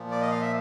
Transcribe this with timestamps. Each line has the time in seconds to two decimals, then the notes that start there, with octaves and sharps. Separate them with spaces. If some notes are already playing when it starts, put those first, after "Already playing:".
Already playing: A#2 F3
0.11 D5
0.21 D#5
0.31 F5
0.41 E5